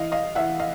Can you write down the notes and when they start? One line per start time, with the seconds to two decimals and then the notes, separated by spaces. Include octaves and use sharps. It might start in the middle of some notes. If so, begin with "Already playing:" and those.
Already playing: E3 D#5 F5
0.12 D#5 F5
0.35 E3 E5 F#5
0.59 D#5 F5